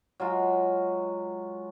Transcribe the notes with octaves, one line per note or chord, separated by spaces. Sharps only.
F#3 G#3 F4